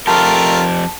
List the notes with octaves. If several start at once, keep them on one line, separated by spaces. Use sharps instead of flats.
F2 A3 F4 G4 A#4 A5